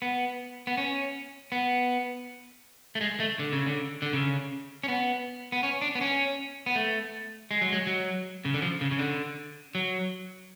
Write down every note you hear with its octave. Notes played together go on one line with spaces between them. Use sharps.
B3
B3
C#4
B3
A3
G#3
A3
D3
C#3
D3
D3
C#3
C#4
B3
B3
C#4
D4
B3
C#4
B3
A3
G#3
F#3
G#3
F#3
C#3
D3
F3
C#3
C#3
D3
F#3